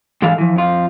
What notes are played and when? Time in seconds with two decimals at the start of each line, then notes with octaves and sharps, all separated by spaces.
0.22 G#2 D3 E3 A4 F5
0.38 E3 F3
0.56 F2 F4